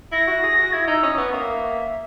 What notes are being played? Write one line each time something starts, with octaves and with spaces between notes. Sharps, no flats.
E4 A#6
F#4
G#4
F#4
E4 G#6
D#4 E6
C#4 D#6
B3 C#6
A#3 E5